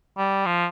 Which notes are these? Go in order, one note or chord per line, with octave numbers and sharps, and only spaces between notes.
G3
F3